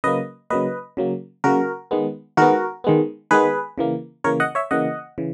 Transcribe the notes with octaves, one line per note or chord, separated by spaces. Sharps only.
C#3 F#3 A#3 B4 D#5
C#3 F#3 A#3 B4 D#5
C#3 F#3 A#3
C#3 F#3 A#3 F#4 A#4
D#3 G#3 B3
D#3 G#3 B3 F#4 A#4
D#3 G#3 B3
D#3 G#3 B3 G#4 B4
C#3 E3 A#3
C#3 E3 A#3 A#4 C#5
D#5 F#5
C#5 E5
C#3 E3 A#3 D#5 F#5
C#3 E3